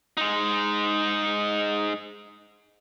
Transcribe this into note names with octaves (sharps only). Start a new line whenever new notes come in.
G#3 D#4